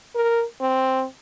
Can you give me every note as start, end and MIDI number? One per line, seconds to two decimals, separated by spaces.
0.15 0.44 70
0.61 1.05 60